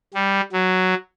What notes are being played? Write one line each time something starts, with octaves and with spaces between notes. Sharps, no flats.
G3
F#3